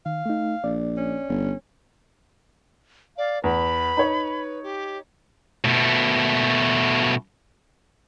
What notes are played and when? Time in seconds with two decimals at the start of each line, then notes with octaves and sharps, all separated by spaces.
0.06 D#3 F5
0.26 A3 D#4
0.64 A#1 D5
0.97 C#4
1.29 G1
3.17 D5 F5
3.44 E2 B4 B5
3.97 D#4 C#5
4.63 G4
5.65 B2 A3